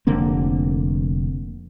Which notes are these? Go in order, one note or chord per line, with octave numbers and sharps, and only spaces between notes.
F1 D3 A#3 C4